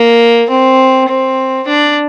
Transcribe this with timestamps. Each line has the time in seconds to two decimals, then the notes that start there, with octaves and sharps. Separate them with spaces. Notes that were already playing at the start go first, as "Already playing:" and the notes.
Already playing: A#3
0.50 C4
1.09 C4
1.67 D4